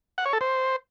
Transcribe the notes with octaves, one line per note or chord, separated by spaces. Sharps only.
F#5
C#5
A4
C5